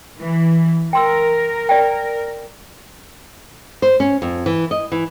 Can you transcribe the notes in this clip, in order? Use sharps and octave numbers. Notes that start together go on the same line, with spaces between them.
E3
A#4 G5 C6 E6
D5 G5
C5
C#4
F2
E3
D#5
E3